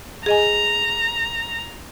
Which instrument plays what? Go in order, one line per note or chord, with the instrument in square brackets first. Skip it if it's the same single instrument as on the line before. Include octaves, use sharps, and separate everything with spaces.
[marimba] G#4 D#5 G#5 [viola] A#5